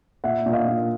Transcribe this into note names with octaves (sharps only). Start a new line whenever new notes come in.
A#2 E5 F#5
A#2
D#5 F5
A#2